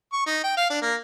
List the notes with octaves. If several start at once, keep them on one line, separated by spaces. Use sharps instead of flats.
C#6
D#4
G5
F5
D4
A#3